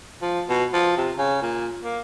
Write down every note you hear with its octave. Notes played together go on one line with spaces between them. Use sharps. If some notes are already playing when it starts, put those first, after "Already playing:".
F3
B2
F3
C3
C#3
A#2
A#3